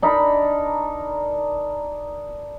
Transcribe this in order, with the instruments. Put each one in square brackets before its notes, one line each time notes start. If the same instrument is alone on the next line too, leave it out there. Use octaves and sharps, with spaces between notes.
[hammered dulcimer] D4 D#4 A#4 B5